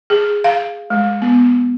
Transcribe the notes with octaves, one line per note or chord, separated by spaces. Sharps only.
G#4
F5
G#3
B3